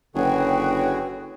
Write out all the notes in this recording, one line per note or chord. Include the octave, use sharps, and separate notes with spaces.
F#1 D3 F#4 G#4 B4 C#5 G5